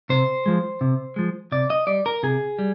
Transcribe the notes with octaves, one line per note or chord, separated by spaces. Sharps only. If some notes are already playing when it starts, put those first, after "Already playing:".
C3 C5
F3 G#3
C3
F3 G#3
C3 D5
D#5
G3 D5
A#4
C3 G#4
G3